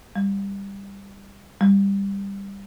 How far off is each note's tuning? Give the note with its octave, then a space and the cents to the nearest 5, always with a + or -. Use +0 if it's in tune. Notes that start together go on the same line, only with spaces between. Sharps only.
G3 +15
G3 +15